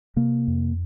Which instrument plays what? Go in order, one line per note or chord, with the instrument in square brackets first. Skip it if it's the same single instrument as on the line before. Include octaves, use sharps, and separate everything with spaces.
[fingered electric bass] C3 A#3
F2